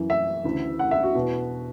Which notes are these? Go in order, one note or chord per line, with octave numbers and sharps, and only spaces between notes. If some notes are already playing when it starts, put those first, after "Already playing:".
Already playing: F#2 E3
E5
D2 C#3 E3
F#5
E5
F#4
E2 B2